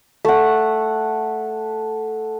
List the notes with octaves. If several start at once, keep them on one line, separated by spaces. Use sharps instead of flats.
A3 F#5